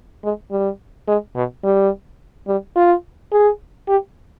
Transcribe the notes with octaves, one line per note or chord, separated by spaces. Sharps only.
G#3
G3
G#3
B2
G3
G3
F4
G#4
G4